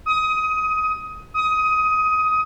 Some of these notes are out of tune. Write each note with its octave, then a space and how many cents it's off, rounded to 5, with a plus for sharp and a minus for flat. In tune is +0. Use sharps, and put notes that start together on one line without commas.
D#6 +20
D#6 +20